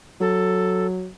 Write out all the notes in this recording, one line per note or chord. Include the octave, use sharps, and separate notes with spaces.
F#3 A4